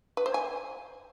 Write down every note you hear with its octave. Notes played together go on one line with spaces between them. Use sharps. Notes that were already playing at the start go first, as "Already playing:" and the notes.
B4
C5
G#5